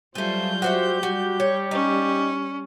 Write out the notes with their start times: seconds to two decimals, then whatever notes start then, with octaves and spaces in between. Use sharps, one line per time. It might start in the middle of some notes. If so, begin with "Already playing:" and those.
0.15 F#3 G3 A3 F4 G#4 C5 G6
0.62 F#4 G4 C5 E5
1.03 G3 F#4
1.40 C#5
1.71 C#4 D#4